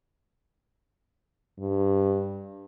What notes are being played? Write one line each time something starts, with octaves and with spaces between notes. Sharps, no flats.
G2